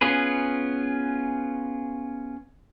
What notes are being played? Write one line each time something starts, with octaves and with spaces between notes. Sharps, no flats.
B3 C#4 F4 G#4 B4